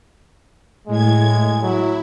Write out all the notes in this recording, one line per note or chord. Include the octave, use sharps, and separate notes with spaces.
A2 G#3 G#6
F#3 E4